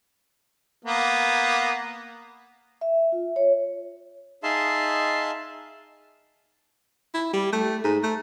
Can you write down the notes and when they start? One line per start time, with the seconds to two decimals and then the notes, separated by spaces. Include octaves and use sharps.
0.85 A#3 B3
2.81 E5
3.12 F4
3.36 C#5
4.43 D#4 G#4 E5 F5 A5 C6
7.14 E4
7.33 G3
7.53 A3
7.84 G#2
8.03 A3